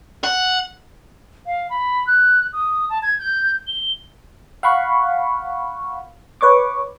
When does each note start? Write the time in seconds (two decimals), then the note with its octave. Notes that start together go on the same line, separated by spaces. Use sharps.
0.24 F#5
1.46 F5
1.70 B5
2.07 F#6
2.53 D#6
2.90 A5
3.03 G#6
3.19 G6
3.67 G7
4.63 F5 F#5 B5 C#6
6.41 B4 C#5 C#6 D6